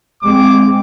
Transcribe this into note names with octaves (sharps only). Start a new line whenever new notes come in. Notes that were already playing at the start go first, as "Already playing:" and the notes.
G#3 C4 D6